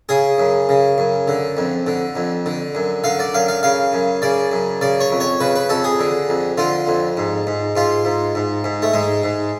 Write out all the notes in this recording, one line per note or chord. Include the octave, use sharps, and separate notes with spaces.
C#3 G#4
F#2
C#3
F#2
D3
F2
D3
F2
D3
F#2
D3 F5
D5
F#2 F5
F5
C#3 F5
F#2
C#3 D5
F#2
C#3 D5
C#5
F2
C#5
C#3 B4
B4
F2 A4
G#4
D3
F2
D3 F4
F2
G#2
G#2
G#2 F4
G#2
G#2
G#2
A3
G#2 G#3
G#2